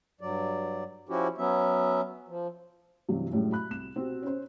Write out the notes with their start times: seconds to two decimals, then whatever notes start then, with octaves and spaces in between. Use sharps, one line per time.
0.21 G2 F#3 D5
1.09 F3 C#4 E4 F#4 G4
1.38 F#3 B3 C#4 E5
2.28 F3
3.09 G2 C3 E3 F#3
3.31 F#2 A2 G3 G#3
3.52 B5 F#6
3.71 C2 E7
3.95 B2 C4 G4
4.22 C#4 C5